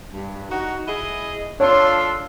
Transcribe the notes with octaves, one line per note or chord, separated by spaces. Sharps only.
G2
D#4 F#4
E4 G#4 D#5
D4 F4 A4 C#5 C6